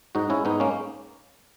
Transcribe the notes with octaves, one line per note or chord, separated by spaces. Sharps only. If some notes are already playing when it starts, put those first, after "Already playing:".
G#2 D#4 F#4
G#2 C#4 E4
G#2 B3 D#4
A#3 C#4